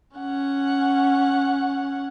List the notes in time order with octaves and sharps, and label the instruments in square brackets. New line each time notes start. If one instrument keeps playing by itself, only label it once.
[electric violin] C#4 F#5